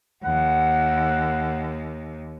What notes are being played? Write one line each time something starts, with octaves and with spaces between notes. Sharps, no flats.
D#2 F#5